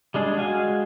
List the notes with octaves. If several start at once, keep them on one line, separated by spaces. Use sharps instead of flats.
G3 G#3 D4 G#4
G#3 F#4 F5 G#5